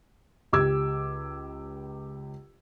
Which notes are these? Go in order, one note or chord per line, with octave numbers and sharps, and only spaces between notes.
C#2 G4 D6 E6 G#6